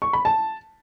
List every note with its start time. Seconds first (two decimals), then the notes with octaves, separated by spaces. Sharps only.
0.02 C#6
0.13 B5
0.25 A5